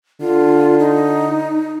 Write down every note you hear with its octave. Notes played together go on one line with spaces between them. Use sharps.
D3 F4
D#4